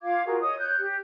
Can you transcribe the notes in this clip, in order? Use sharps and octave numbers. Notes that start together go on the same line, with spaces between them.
F4 F5 D6 G#6
F4 F#4 G#4 A#4
C#5 D#5 D#6
C#5 F#6 G6
G4